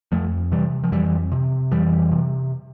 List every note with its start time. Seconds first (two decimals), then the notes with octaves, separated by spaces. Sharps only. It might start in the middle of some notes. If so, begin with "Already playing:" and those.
0.12 F2 F3 A3
0.52 C3 E3 G3
0.84 F3
0.92 F2 E3 G3
1.32 C3
1.72 F2 E3 G3
2.11 C3